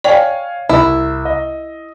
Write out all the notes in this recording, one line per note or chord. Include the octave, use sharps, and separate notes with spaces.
C#5 D5 F5 G5 G#5
C2 E4
D#5